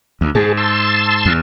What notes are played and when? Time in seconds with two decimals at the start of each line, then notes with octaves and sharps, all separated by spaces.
0.21 D2
0.35 G#2 G#4 A5
0.57 A5 C6 E6
1.26 E2